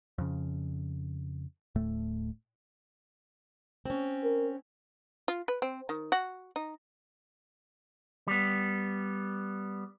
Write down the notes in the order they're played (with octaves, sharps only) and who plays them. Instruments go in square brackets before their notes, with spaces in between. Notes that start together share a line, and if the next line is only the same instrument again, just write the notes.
[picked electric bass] F2 C#3
D1 A2 A3
[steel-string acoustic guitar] C4 C#4
[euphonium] A#4
[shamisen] F4
B4
C4
D#3
F#4
D#4
[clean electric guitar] G3 B3